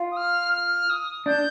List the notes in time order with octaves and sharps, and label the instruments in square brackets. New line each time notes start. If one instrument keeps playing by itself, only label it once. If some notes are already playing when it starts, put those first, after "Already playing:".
Already playing: [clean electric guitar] F4
[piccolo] D#6
F6
F6
D#6
[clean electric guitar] D4 [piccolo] G6